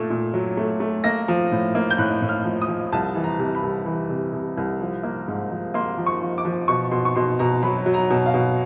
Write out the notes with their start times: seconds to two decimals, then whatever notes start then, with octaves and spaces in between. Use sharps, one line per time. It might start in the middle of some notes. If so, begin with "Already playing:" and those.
Already playing: A#2 A3
0.10 A#2
0.34 F#3
0.57 A3
0.80 A3
1.04 A#3 A#6
1.28 F3
1.52 A2
1.75 A#3
1.91 G6
1.98 A2 F#6
2.22 A2
2.29 F6
2.45 F3
2.62 D#6
2.68 F3
2.92 C2 A5
3.15 E3
3.24 A#5
3.39 C3
3.55 B5
3.63 C2
3.86 E3
4.09 C3
4.33 C3
4.58 C2
4.81 F3
5.03 A#3
5.28 G#2
5.51 F3
5.74 A#3 C6
5.98 F3
6.06 C#6
6.22 F3
6.38 D6
6.45 F3
6.68 B2 C#6
6.91 B2 C6
7.05 C#6
7.16 B2 C6
7.39 B2 A#5
7.63 F#3 B5
7.86 F#3
7.94 A#5
8.10 B2
8.26 F5
8.34 B2